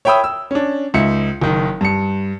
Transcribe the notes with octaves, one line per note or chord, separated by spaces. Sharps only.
C#5 E5 G5 B5 D#6 E6
E6
C#4 D4
C#2 D#4 E5 C#7
F#1 D#3
G2 C#7